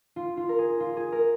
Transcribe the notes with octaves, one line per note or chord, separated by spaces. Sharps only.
F4
F4
A#4
G#4
F4
G#4
A#4